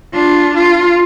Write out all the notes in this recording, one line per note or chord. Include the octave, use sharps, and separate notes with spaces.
D4 F4
F4